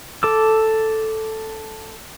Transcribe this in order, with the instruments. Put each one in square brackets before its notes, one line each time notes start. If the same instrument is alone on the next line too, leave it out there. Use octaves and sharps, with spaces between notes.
[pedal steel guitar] A4 D6 E6